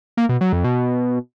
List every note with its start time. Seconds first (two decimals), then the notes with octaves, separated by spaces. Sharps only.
0.17 A#3
0.29 B2
0.41 F#3
0.53 F2
0.64 B2